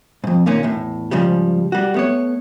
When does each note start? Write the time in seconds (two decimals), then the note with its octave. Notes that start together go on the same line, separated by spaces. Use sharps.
0.24 F2 G#2
0.46 D#2 A#2 A#3 C#4 D#4
0.63 E2 A2
1.11 G#2 C#3 F3 G3
1.72 G3 F#4
1.94 A3 B3 C#5